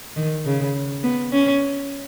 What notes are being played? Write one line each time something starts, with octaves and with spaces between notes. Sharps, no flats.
D#3
C#3
B3
C#4